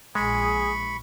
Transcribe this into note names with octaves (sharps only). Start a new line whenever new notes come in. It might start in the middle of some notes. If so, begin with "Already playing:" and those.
A#1 G#3 G#4 B5 C#6